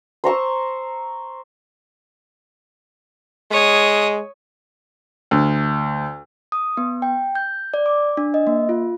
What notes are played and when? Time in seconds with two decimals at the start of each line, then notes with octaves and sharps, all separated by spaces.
0.24 C5 A#5 C#6 E6
3.52 G#3 C#5 D#6
5.31 D2
6.52 D#6
6.77 B3
7.02 G5
7.35 G6
7.74 D5
7.86 D6
8.17 D4
8.34 D#5
8.47 A#3
8.69 F4